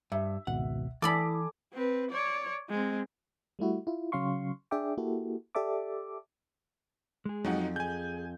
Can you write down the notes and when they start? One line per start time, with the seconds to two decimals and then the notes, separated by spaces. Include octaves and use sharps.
0.12 G2 E5
0.47 G#1 C#2 B2 F#5
1.02 E3 E4 A4 D5 G#5 B5 D6 D#6
1.74 C4 B4
2.10 C#5 D5
2.69 G#3 C4
3.59 G3 A3 E4 F#4
3.87 E4 F4
4.12 C#3 F#3 C#4 F5 C6 C#6
4.71 D4 G#4 D5 E5 G5 D6
4.98 A#3 E4 F#4 G4 A4
5.55 G4 A4 D5 E5 A5 D6
7.25 G#3 G#4
7.45 F2 F#3 D#4 F#5
7.76 G#4 G#5 G6